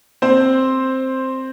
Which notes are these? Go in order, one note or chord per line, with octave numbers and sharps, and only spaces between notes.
C4 C5